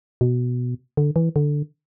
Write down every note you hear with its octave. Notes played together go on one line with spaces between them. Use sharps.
B2
D3
E3
D3